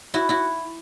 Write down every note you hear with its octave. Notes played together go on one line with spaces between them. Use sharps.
E4 F#4
E4 F#4